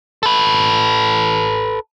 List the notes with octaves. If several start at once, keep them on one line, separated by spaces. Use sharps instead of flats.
A4 B4